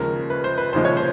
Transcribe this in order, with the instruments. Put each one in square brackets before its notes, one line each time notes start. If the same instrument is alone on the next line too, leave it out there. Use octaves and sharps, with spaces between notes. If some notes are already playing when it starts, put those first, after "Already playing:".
Already playing: [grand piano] D#2 C#3 F3 G#3 A#4
B4
C5
B4
D#2 C#3 F3 G#3 C5
C#5
C5